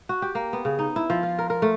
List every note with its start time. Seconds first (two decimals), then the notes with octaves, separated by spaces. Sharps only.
0.09 F#4
0.22 G4
0.35 A#3
0.53 B3
0.65 C#3
0.79 D#4
0.96 E4
1.10 F3
1.23 F4
1.38 A#4
1.50 A#4
1.62 A3